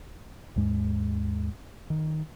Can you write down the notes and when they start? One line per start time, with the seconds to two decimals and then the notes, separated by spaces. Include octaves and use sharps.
0.56 D#2 G#2 G#3
1.90 D#3